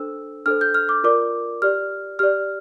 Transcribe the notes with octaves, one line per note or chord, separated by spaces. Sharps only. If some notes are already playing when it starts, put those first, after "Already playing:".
Already playing: D4 A4 C5 E6
D4 A4 C5 F6
G6
F6
D6
F4 A#4 D5 D6
G4 D5 F6
G4 D5 F6